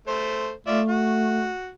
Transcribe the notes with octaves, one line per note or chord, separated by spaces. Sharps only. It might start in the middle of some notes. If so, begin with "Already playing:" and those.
A3 C5
A3 F4 D5 E5
F#4